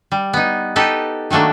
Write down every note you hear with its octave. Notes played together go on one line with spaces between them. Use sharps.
G3
B3 D#4
D#4 G4 A4 B4
D#3 F#3 A3 A#3 D4